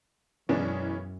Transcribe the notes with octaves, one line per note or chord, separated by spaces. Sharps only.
B1 F#2 E3 G#3 B3 C#4 D4